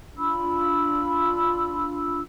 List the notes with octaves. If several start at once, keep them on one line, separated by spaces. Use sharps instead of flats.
D4 F4 B5 E6